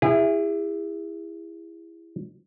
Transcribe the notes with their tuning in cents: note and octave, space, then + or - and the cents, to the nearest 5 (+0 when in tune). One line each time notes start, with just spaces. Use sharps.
E4 +10 G#4 -35